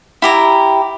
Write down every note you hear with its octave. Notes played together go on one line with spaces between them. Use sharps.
E4 G4 A#5